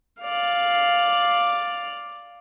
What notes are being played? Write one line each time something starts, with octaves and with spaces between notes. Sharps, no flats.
D5 F5